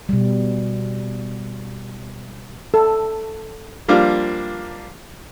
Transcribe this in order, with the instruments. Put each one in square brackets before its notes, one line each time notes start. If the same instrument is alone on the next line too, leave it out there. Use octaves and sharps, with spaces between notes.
[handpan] B2 G3
[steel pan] A4
[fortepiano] F3 G3 A#3 D4 F4